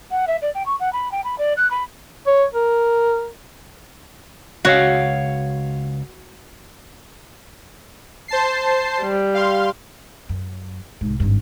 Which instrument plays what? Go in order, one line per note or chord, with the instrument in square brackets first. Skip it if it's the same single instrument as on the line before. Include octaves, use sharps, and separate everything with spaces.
[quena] F#5
E5
D5
G5
C#6
F#5
B5
G5
B5
D5
F#6
B5
[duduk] C#5
A#4
[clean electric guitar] C#2 C#5 F5 [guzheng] F#4
[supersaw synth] C5 A5 C7
[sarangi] G3
[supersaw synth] F5 C6
[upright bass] F#2
C2 G#2
G#1 G2